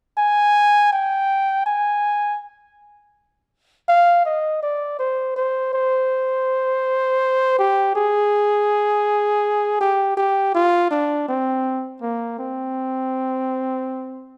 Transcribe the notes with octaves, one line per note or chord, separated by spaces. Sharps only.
G#5
G5
G#5
F5
D#5
D5
C5
C5
C5
G4
G#4
G4
G4
F4
D4
C4
A#3
C4